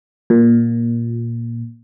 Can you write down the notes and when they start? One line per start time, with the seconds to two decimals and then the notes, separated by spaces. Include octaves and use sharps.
0.30 A#2